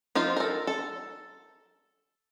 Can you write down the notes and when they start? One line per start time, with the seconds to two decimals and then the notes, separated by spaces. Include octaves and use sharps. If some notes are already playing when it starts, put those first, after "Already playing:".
0.15 F3 D#4 F4 C5
0.37 A4 A#4
0.67 A4